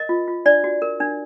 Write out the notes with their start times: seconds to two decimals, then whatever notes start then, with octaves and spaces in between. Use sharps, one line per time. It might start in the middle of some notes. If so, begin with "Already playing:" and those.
Already playing: A#4 D#5
0.09 F4
0.28 F4
0.45 D4 D5
0.64 F#4
0.82 A#4
1.00 D4